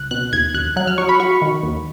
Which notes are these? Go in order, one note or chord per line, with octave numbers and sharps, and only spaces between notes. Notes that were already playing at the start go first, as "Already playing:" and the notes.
Already playing: C#2 F#6
B2 F#6
D#2 G#6
D#2 F#6
F#3 F#6
F6
F#3 C#6
B5
F#3 C#6
D#3
D#2